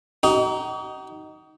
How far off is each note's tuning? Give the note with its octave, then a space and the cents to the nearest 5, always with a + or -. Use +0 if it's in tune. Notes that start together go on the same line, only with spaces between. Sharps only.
D#4 +5 F#4 +45